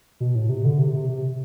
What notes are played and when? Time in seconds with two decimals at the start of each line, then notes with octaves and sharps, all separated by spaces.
0.20 B2
0.35 A2
0.49 C3
0.65 D3
0.79 C3
0.94 C3
1.09 C3